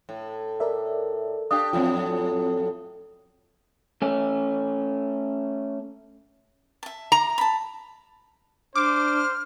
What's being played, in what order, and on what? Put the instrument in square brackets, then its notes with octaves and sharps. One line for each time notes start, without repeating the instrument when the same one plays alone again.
[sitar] A2
[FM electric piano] A#4 D5 E5
[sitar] D4 G4 [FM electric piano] F5 [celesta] D#6
[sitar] F2 A2 F#3 [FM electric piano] C4 F4
[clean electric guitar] A3 C#4
[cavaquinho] E5 A5
[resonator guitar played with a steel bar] A#5
[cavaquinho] A5 B5
[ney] D4 [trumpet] C5 [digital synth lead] D6 [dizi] F6